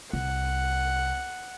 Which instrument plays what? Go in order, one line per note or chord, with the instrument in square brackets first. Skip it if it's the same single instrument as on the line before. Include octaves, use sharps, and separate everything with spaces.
[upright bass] C2 [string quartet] F#5